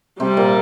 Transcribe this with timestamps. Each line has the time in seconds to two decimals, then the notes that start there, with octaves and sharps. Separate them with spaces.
0.19 C3 G3 C4
0.37 A#2 A#3